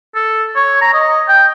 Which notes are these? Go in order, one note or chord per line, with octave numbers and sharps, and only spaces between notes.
A4
C#5
A#5
D#5
G5